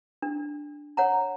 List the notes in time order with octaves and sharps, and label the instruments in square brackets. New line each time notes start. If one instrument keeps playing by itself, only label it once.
[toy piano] D4
C#5 F#5 A#5